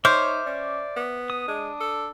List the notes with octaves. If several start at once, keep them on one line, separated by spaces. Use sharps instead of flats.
D#4 C5 C#5 E5 D6 F6
C#4 D5
B3
D#6
G#3 D4
A4